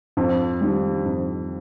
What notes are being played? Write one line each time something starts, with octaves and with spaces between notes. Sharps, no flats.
F2
D#3 G3
F2